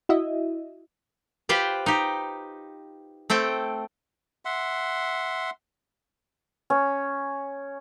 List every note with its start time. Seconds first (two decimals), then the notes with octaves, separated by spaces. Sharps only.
0.09 E4 F#4 D#5 E5
1.49 F4 G4 B4 C5
1.86 D#4 G4
3.30 A3 C4 A4 G5
4.45 E5 F#5 C6
6.70 C#4